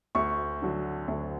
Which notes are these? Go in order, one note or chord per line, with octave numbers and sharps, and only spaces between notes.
D2 C#6
D3 F#3
D2